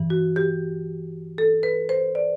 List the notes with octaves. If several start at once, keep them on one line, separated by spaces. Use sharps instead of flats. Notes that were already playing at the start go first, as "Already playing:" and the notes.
Already playing: G2 E3
F#4
G4
A4
B4
C5
D5